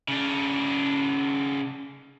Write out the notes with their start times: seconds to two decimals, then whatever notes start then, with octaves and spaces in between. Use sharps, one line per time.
0.08 C#3 D4